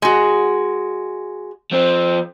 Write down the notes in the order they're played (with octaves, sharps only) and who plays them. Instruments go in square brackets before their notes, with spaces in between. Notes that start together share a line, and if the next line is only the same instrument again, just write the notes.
[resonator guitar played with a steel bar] G#3 F#4
[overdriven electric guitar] F3 C4